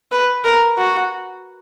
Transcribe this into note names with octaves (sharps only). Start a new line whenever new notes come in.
B4
A#4
F#4